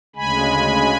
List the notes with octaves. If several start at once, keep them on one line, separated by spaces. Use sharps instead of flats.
D2 C#3 G#3 G#5 B5